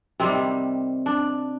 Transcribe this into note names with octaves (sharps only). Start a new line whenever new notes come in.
C3 D#3 G3 C4
D4